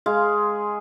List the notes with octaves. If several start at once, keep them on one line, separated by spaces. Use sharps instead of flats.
G#3 G#4 F5